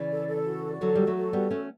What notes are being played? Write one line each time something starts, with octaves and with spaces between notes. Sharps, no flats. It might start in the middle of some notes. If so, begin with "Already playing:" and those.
Already playing: C#3 E3 D5
A4
A4
F#4
D5
D3 F#3 A4
G3 F#4
F#3 A3
A4
G3 B3 F#4
A3 C#4 F#4